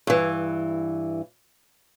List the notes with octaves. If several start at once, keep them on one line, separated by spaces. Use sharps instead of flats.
G2 E3